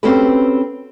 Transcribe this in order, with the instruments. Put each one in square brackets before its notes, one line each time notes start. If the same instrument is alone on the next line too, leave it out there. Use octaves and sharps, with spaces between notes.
[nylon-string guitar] C4 C#4 F#4 G4 A4 B4